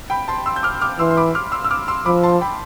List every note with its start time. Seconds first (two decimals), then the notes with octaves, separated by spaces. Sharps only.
0.10 G5 B5
0.28 A5 C6
0.46 C6 E6
0.56 G6
0.63 D6 F6
0.81 D6 F6
0.99 E3 C6 E6
1.11 C6
1.17 B5 D6
1.35 D6 F6
1.52 C6 E6
1.64 E6
1.71 D6 F6
1.88 C6 E6
2.06 F3 B5 D6
2.23 A5 C6
2.41 G5 B5